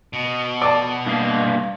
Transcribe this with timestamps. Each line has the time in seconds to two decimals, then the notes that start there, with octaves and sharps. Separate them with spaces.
0.13 B2
0.62 D5 A5
1.06 G2 A#3 F5